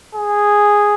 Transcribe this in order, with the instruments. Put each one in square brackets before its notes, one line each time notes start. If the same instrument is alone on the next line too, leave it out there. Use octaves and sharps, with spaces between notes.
[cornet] G#4